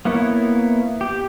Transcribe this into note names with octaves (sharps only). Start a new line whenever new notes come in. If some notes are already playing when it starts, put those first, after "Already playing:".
A#3 B3 E4 C#5
G4